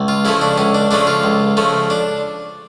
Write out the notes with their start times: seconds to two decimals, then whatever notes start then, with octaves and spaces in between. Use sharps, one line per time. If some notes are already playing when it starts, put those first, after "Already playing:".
Already playing: C#2
0.08 F4
0.25 C#3 F3 A3 E4
0.41 D4
0.58 C#2 C#4
0.75 D4
0.91 C#3 F3 A3 D4
1.07 F4
1.24 C#2
1.57 C#3 F3 A3
1.90 D4